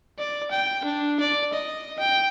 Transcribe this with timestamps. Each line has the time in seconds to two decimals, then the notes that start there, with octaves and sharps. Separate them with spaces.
0.18 D5
0.51 G5
0.84 D4
1.20 D5
1.53 D#5
1.99 G5